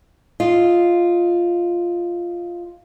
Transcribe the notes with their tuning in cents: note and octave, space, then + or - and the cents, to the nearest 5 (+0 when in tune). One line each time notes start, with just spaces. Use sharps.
F4 -5 D#5 +0